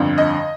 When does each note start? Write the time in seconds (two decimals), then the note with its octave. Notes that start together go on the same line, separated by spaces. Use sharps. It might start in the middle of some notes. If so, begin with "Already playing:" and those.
Already playing: G1 F2 D3
0.18 D#5